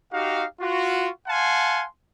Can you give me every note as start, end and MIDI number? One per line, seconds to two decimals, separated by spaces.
0.12 0.45 63
0.12 0.45 66
0.12 0.45 67
0.12 0.45 77
0.60 1.08 65
0.60 1.08 66
1.28 1.85 77
1.28 1.85 78
1.28 1.85 80
1.28 1.85 81
1.28 1.85 84